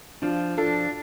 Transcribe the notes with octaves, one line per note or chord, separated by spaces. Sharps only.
F3 D4 F4
D4 F4 A4